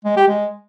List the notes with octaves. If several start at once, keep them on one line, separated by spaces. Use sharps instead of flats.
G#3
G4
G#3